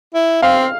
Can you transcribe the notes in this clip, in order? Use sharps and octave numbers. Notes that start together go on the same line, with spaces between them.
E4
C4 F5